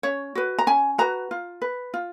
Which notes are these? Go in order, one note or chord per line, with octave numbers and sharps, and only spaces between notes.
C#4 C#5
F#4 B4
A#5
C#4 G#5
F#4 B4 A#5
F4
B4
F4